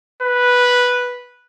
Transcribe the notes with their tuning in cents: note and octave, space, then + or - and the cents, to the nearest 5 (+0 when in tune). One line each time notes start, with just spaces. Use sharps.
B4 -5